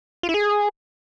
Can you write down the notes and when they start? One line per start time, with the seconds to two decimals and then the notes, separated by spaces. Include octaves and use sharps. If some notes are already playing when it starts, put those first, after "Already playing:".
0.23 F4
0.29 E4
0.34 G#4